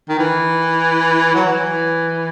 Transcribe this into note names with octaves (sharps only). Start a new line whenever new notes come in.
D#3
E3
F#3
E3